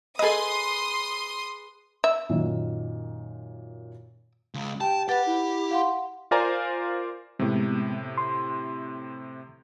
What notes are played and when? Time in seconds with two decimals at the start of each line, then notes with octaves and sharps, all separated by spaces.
0.19 G#4 A4 B4 D#5 C6 D#6
2.04 E5
2.29 F#2 A#2 D#3
4.54 C#2
4.81 G4 G5 A5
5.09 G4 B4 F#5 A6
5.26 E4
5.71 F5 F#5 C6
6.31 F4 A#4 C5 D5 G#5 A#5
7.39 A2 C3 G#3 B3
8.18 C6